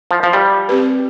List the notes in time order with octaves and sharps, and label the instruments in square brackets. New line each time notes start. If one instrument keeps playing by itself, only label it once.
[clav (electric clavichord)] F3
F3
G3
[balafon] C4 G4 B4